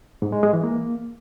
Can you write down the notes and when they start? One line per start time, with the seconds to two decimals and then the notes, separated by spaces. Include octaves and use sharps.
0.22 G#2
0.32 G#3
0.43 G#3
0.53 E3
0.64 A#3